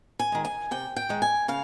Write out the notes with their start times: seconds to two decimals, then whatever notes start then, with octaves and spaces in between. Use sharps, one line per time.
0.19 G#5
0.32 D#3 G#3
0.45 G#5
0.71 C3 G5
0.96 G5
1.09 D#3 G#3
1.22 G#5
1.48 C#3 F5